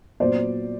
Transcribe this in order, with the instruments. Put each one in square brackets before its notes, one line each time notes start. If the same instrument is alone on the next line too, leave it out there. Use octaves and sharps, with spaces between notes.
[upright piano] A#2 F#3 B3 C5 D5